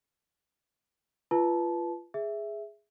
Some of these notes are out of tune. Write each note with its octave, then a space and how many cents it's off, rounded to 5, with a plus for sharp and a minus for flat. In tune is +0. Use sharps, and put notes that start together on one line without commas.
F4 -20 B4 -10 A5 -20
G#4 +0 E5 +0